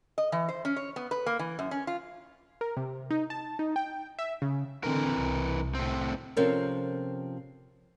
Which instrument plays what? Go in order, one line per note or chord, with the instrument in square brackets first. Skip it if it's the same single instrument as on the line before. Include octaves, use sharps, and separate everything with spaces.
[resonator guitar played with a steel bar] D#5
E3
C5
C#4
C#5
B3
B4
A#3
E3
F#2
C#4
F4
[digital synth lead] A#4
C3
D#4
A5
D#4
G5
E5
C#3
[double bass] D3 C4 [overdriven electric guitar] E3 A#4
[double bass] C2
[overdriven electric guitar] A2 C4
[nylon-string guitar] C3 F3 C4 C#4 A4 A#4